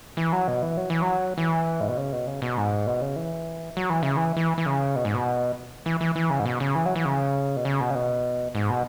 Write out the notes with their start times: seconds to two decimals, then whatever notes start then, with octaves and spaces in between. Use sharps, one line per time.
0.17 E3
0.33 F#3
0.48 B2
0.62 E3
0.77 F#3
0.90 E3
1.02 F#3
1.38 E3
1.80 G#2
1.89 B2
1.97 C#3
2.13 B2
2.27 C#3
2.42 B2
2.57 G#2
2.87 B2
3.01 C#3
3.16 E3
3.77 F#3
3.90 E3
4.03 C#3
4.17 E3
4.37 E3
4.58 E3
4.66 C#3
4.96 B2
5.05 G#2
5.15 B2
5.86 E3
6.01 E3
6.16 E3
6.30 C#3
6.40 G#2
6.46 B2
6.60 C#3
6.75 E3
6.86 F#3
6.96 E3
7.05 C#3
7.56 B2
7.65 C#3
7.80 B2
7.90 C#3
7.95 B2
8.55 G#2
8.70 B2